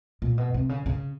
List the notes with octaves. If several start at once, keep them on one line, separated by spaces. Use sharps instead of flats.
A#2
B2
C3
C#3
C#3